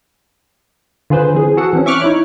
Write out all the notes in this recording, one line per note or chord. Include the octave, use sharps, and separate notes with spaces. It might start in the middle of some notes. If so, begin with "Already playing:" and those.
D3 F4 G#4 B4 C5
E3 C4 G#4
F#4 G#4 A4 F#5
E3 C4 C#4
E5 C#6 D6 F6 F#6
D#4 E4 C#5